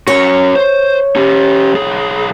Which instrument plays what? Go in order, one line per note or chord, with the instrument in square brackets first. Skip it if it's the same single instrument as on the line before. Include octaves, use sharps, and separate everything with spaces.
[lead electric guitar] C#4 F#4 [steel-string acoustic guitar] C#5
[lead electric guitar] C5
C#4 G4
B1 G#4